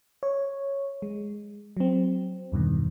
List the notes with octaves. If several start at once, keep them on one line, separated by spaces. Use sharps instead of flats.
C#5
G#3
F#3 C4
E2 G2 B2 D#3